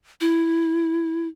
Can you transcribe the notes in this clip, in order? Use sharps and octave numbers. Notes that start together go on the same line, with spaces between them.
E4